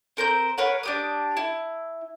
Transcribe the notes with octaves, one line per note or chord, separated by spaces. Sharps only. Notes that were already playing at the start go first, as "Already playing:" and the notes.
C4 A#4 C5 G6
A#4 B4 C#5 F#5
D4 G4 D#6
E4